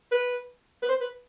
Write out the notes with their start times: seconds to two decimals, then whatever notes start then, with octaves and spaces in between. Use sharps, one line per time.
0.12 B4
0.82 B4
0.89 C5
1.01 B4